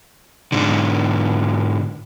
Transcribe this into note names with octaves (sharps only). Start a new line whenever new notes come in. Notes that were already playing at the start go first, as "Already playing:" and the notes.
G#2 D3